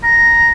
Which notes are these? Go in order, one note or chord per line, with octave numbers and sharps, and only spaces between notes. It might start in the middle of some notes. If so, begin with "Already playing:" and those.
A#5